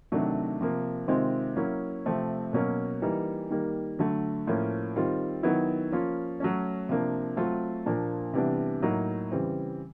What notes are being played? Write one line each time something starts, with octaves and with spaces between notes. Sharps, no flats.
C3 D#3 F#3 A3 D4
C3 F3 A#3
C3 D#3 G#3 C4 F4
F#3 A#3 C#4 E4
C3 F3 A3 C4
B2 F#3 A#3 C#4
E3 G3 A#3 D#4
D#3 G3 A#3
D3 F#3 A3
A2 F3 A#3 C#4 F4
D#3 G3 C4 F4
D#3 F#3 B3 E4
F3 A#3 C#4 F4
F#3 A3 C#4
C3 F3 A#3 D4
F#3 A3 C4 F4
A#2 F3 A#3 D4
C3 E3 G3 B3 D4
A2 F#3 A#3 D#4
C#3 E3 G3 C4